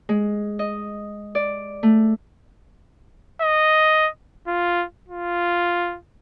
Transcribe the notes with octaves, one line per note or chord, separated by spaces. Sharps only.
G#3
D#5
D5
A3
D#5
F4
F4